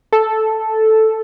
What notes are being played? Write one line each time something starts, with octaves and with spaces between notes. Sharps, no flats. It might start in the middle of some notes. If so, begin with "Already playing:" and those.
A4